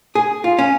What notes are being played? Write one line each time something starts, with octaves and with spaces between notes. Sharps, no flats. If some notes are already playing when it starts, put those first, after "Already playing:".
G#4
F4
C#4